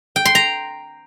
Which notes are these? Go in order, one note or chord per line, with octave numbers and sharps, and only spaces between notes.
G5
C6
A#5